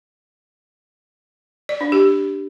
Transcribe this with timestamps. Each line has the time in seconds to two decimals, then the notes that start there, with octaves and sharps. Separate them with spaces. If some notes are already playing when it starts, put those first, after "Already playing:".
1.69 D5
1.81 D4
1.92 G4